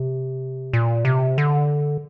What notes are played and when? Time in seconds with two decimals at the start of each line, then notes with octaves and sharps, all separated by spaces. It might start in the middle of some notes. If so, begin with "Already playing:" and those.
Already playing: C3
0.73 A#2
1.05 C3
1.38 D3